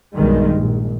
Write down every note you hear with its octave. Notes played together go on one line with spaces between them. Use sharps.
B1 G2 D#3 G3 G#3
A#1